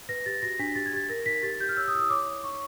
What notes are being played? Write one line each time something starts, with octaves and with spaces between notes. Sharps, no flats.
B4 A#6
G4 A6
F#4 A#6
D4 B6
G4 A6
G#6
G4 A6
A#4 A#6
D#4 B6
G4 A6
G4 G6
F6
C#5 E6
D#6
E4 E6
D#6
C#5 D6
C#5
D#4 C#6